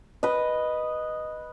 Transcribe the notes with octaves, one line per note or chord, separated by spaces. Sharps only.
B4 D#5